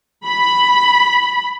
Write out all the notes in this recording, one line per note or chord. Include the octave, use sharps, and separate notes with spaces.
B5